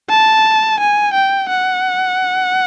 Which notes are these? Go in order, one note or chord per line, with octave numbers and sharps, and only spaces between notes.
A5
G#5
G5
F#5